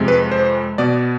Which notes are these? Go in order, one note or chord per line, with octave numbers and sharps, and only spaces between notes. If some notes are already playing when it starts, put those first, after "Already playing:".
Already playing: F2 C3 G#3
B4
C5
B2 B3 D5